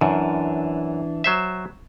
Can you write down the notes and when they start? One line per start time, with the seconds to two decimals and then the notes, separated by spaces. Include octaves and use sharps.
0.01 F#2 E3 D4
1.24 F#3 C5 E5